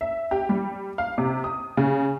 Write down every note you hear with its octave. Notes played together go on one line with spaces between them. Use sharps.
E5
G4
G3
F5
C3
D#6
C#3